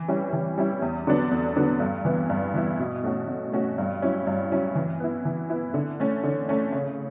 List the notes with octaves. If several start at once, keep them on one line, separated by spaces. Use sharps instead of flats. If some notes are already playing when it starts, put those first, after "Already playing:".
Already playing: E3
G3 C#4 E4
E3
G3 C#4 E4
E2
D3 F#3 B3 D4
E2
D3 F#3 B3 D4
G2
E3 B3 E4
G2
E3 B3 E4
B2
A3 C#4 F#4
B2
A3 C#4 F#4
G2
F#3 C#4 E4
G2
F#3 C#4 E4
E3
B3 E4
E3
B3 E4
D3
A3 C#4
D3
A3 C#4
C#3